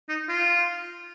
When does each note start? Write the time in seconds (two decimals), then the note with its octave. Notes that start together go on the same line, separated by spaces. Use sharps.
0.09 D#4
0.28 F4